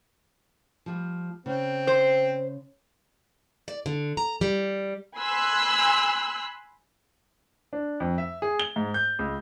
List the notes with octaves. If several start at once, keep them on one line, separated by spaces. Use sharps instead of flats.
F3 G3
C#3 C4
C5
D5
D3
A#5
G3
G#5 B5 C6 E6 F#6
D4
F2
E5
G#4
G7
G#2
G6
C#2